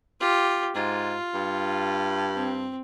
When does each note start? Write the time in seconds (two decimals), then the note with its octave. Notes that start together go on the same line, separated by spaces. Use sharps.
0.20 F4 G4
0.75 G#2 F4
1.34 G2
2.35 C4